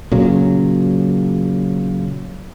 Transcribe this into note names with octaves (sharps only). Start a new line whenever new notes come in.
A#2 C#3 F#3